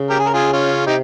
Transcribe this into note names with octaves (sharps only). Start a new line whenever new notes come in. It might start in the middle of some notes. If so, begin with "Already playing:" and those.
Already playing: C#3
G4 A#4
G#4
A#4
F4 G#4
C#4 F4
C3 D#4 G4